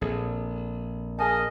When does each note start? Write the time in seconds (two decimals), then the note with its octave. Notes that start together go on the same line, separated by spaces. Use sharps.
0.01 A#1 A#2 C4 G#4 A4 D5
1.19 A#3 G#4 A#4 D#5 G#5 A5